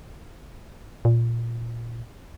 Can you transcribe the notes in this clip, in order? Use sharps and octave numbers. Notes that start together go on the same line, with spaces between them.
A#2